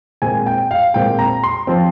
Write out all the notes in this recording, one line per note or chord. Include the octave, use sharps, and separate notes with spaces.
A#2 G#3 C4 G#5
G5
F5
A#2 G#3 C4 G5
A#5
C6
F3 C4